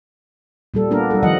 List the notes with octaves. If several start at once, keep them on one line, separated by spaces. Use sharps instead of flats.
A#2 G3 A4
A#3 B3 D4 A#4
G3 A4
D#3 F3 G3 D#5 F#5